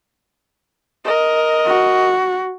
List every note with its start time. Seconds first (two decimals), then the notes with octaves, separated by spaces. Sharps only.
1.04 A#4 D#5
1.66 F#4